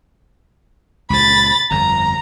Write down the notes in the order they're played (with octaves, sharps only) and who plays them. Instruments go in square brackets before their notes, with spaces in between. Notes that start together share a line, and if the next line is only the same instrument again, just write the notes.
[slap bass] C#2 A#2 C#3 [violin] B5 A6
[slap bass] G1 F2 [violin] A#5